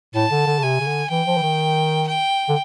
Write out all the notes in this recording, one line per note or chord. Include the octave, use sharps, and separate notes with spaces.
A2 A5
D3
D3
C#3
C3 G#5
C#3
D3
E3 G5
F3
E3
D#3
G5
D3